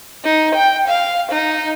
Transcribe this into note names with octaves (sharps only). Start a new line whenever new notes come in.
D#4
G5
F5
D#4